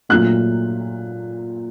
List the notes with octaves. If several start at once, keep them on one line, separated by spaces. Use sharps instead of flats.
A#2 F#3 A3 F#6